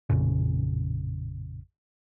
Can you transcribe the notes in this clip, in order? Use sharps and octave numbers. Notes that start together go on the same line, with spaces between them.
A1 F2 A#2 C#3